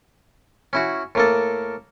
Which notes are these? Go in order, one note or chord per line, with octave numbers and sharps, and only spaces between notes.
C#4 E4 F#4
A2 A#3 A4